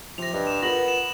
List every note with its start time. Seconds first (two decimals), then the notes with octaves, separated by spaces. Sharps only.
0.18 C3 F3 A#6 F7
0.33 G2 D#5
0.47 E7
0.62 B3 F4 A#4 B4 A#6 F#7
0.88 E7